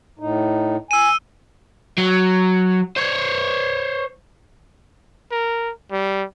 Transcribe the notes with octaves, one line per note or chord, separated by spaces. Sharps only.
A2 D#4
G#5 E6 D#7
F#3
C5 C#5
A#4
G3